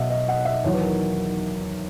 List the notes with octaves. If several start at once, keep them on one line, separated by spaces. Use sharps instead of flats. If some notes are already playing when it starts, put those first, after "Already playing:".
Already playing: B1 B2 F#3 D#5 E5 F#5
D#5
F#5
E5
E2 D#3 F#3 C#5
B4
A#4